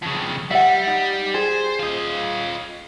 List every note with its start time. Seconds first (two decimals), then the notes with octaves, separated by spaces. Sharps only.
0.03 F2 C#3
0.50 G3 E5 F#5
0.87 D#4
1.34 G#4 C5
1.79 F4 D#5